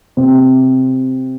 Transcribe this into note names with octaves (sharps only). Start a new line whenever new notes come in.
C3